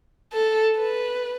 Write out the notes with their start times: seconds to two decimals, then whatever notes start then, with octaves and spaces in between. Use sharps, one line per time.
0.33 A4
0.78 B4